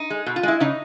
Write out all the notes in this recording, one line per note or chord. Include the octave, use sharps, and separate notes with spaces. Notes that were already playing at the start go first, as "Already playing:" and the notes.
Already playing: D#4
G#3
B2
F4
G#3 E4
C#3 D#4